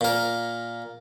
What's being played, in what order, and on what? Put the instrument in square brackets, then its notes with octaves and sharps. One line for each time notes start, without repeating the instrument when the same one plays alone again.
[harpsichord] A#2 A#4